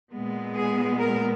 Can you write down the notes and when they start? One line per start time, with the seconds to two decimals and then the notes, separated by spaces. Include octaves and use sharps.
0.12 A#2 G#3 B3
0.55 G#4
0.99 A#4